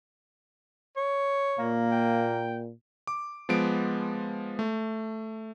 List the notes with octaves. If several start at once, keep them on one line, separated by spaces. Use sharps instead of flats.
C#5
A#2 A#3
G5
D6
F3 G#3 B3 D7
A3